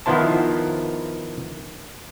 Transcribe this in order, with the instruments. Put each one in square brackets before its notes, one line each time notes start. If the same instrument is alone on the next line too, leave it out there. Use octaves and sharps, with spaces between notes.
[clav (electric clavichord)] D#3 F3 B3 E4 C5 A5